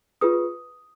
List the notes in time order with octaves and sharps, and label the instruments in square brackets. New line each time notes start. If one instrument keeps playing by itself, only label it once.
[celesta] F4 G#4 B4 D#6